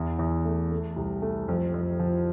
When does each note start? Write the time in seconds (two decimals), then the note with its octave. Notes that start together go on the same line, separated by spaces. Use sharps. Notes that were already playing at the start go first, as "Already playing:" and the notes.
Already playing: E2
0.19 E2
0.45 A3
0.71 A3
0.96 C2
1.22 A3
1.48 F2
1.74 F2
1.99 F3